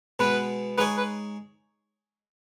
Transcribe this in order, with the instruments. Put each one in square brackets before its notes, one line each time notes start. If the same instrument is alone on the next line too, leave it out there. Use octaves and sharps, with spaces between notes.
[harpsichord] B2 G#3 B3 [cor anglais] B4
[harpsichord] G#3 D#4 G#4 C#5 [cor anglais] B4
[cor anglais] B4